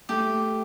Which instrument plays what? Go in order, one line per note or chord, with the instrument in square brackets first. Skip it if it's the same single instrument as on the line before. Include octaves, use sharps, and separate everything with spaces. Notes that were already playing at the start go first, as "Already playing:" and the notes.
[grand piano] A3 [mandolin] G4